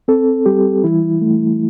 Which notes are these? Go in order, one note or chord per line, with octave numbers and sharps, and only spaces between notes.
C4 A4
G3 G4
E3 E4
A3